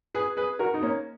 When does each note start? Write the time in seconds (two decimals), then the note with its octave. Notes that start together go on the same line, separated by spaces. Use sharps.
0.14 G#4 B4
0.37 G#4 B4
0.59 F#4 A#4
0.74 D#4
0.82 A#3 C#4